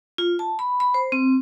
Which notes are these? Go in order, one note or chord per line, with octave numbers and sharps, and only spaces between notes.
F4
A5
B5
B5
C5
C4